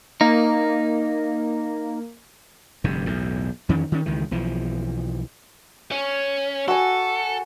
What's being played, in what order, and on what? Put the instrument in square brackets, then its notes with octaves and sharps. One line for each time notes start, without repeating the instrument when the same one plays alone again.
[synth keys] A#3 [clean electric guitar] D#4
[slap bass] F1 G2 D3
B1 E2 A2
F2 D#3 E3 C#4
D#3 C#4
C#2 D#3 E3
B1 E3 F3
[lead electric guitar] C#4
[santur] F#4 G#5 [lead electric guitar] A4